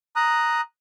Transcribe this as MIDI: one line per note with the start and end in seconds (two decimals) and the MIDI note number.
0.16 0.61 82
0.16 0.61 87
0.16 0.61 90